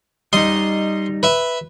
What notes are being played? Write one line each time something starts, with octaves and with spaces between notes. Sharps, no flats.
G3 D#4 D#5 C6
B4 E5